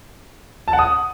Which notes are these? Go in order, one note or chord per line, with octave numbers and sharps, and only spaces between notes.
A5
F#5
D#6